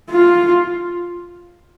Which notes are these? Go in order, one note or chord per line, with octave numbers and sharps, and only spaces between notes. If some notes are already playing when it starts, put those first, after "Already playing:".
F4